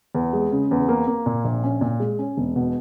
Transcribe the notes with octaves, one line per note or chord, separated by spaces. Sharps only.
E2
G#3
C#3
E2
A#3
A#3
A#2
A#1
C#4
A#2
G#3
C#4
E1
B2